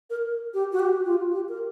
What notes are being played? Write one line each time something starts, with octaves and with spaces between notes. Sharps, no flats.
A#4
G4
F#4
G4
F4
G4
A#4